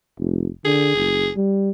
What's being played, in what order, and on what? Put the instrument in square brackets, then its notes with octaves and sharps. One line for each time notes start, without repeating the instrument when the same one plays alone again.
[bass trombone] F1
[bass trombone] D3 [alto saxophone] G#4
[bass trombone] F#1
G3